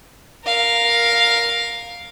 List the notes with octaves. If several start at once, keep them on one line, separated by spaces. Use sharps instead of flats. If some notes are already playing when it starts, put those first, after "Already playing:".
A#4 F5